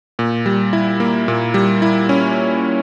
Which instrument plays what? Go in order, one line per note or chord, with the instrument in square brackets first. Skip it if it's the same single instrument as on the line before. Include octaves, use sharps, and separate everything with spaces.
[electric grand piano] A#2
G3
E4
A#3
A#2
G3
E4
C#4